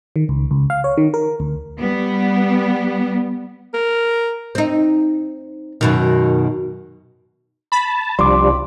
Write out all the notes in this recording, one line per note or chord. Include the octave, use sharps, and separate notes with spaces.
D#3
C#2
C#2
F5
C#5
D#3
A#4
D2
G3 B3
A#4
C4 D#4
F#2 B2 D#3
A5 B5
C2 F3 G3 D4 C6 D6